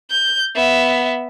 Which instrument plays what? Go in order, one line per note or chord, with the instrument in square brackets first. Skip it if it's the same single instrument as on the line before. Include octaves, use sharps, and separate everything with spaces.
[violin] G6
B3 E5